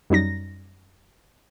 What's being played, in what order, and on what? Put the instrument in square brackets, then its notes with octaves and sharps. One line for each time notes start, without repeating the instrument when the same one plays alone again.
[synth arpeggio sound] F#2 G3 D#4 A#6